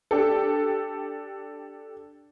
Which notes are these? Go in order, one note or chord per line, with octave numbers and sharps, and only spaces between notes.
D4 G4 A4